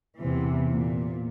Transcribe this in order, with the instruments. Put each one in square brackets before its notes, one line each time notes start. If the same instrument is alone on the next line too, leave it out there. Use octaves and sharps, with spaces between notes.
[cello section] E2 C3 E3
A#2